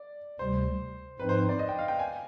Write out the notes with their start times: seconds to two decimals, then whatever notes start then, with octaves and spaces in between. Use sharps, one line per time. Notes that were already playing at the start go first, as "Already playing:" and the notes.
Already playing: D5
0.39 D2 C3 G3 C5
1.19 G#2 F3 C4 D#4 B4
1.29 C5
1.39 C5
1.49 D5
1.59 D#5
1.69 G5
1.79 F5
1.88 G5
1.99 G#5